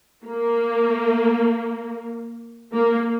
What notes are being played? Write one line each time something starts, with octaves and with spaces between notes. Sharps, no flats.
A#3
A#3